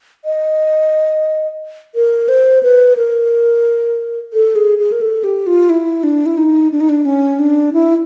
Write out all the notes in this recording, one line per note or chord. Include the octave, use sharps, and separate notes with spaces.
D#5
A#4
C5
B4
A#4
A4
G#4
G#4
A#4
A4
G4
F4
E4
D4
E4
D#4
D4
D#4
D4
C#4
D4
E4